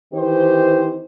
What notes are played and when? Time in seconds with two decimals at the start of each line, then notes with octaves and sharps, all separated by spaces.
0.13 D#3 E3 C4 G4 C5